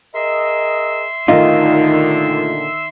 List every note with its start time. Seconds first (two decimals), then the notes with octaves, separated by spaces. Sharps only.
0.15 G#4 A#4 D#5 E5 C6 E6
1.28 A#2 D3 D#3 A3 D#4 F4